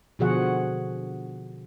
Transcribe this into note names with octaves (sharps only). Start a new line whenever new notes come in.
B2 D3 F3 F#4 G#4 F#5